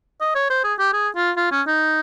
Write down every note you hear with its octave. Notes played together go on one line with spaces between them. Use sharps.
D#5
C#5
C5
G#4
G4
G#4
F4
F4
C#4
D#4